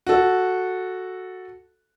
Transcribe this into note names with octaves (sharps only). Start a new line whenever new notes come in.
F#4 A4